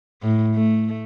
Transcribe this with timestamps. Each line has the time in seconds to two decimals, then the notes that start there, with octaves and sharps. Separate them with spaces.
0.23 A2
0.55 A3